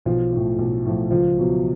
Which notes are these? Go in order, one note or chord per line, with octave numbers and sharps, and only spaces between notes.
B1 F3 F4
A2 F3
B1
A2 F3
C#2 F3 F4
B2 F#3